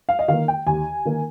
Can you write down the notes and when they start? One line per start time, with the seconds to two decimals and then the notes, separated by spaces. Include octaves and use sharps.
0.09 F5
0.19 D#5
0.28 D#3 A#3 F5
0.48 G5
0.67 D#2 G#5
1.05 D#3 A#3